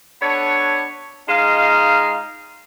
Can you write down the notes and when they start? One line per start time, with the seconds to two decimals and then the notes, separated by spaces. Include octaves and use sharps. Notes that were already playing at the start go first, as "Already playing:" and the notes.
0.22 B3 D4 A4 C#5
1.29 G#3 D#4 F4 F5